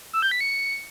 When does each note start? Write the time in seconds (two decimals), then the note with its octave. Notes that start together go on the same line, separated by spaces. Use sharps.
0.13 E6
0.22 G6
0.31 B6
0.40 C#7